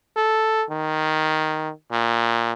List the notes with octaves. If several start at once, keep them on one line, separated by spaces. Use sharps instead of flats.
A4
D#3
A#2